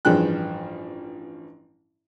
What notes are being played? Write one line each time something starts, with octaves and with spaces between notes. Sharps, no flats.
A1 G2 F3 G#4 G5 F#6